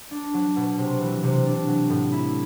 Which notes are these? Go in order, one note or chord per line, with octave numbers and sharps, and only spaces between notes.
D4
F#3
B2
C3
E3
C3
D4
F#3
A2
E4